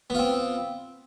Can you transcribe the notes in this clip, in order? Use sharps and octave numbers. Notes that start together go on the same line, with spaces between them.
B3 C4 F4